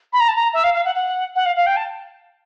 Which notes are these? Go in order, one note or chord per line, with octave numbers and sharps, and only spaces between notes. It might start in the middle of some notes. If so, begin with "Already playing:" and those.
B5
A#5
A5
A#5
E5
F5
F5
F#5
F#5
F#5
F5
F5
G5
A5